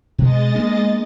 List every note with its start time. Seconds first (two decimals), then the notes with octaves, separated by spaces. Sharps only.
0.18 B2 G#3 D#5 A6
0.55 A#3 B3 D4